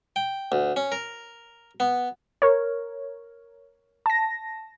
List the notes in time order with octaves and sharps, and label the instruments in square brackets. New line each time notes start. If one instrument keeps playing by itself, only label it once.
[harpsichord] G5
D2
C#4
A#4
B3
[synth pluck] A#4 C#5
A5 A#6